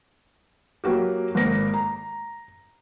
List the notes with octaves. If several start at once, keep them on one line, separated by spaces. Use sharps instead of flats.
F#3 A#3 F#4 G4
G#1 A#3 A#6
A#5